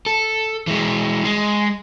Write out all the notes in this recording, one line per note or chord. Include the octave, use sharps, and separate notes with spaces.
A4
E3 G#3
G#3